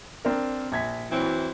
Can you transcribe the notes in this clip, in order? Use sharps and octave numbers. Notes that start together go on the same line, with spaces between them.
C4 D4 A#4
A#1 G#6 B6
E3 F#3 C4